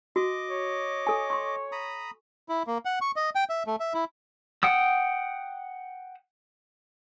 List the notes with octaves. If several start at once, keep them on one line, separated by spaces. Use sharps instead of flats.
F#4 D#5 D6
C#5
A4 G#5
C6 C#6
A#5 B5 D#6
E4
A#3
F#5
C#6
D#5
G5
E5
A3
E5
E4
F#5 G5 D#6 E6